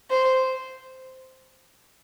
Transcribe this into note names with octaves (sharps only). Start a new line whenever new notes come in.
C5